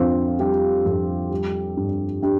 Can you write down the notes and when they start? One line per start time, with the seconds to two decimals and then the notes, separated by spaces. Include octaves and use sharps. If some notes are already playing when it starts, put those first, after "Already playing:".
Already playing: F2 D3 C4 D4 F4
0.39 G3 D4 G4
0.86 F2
1.31 G3
1.77 G2
2.22 D4 G4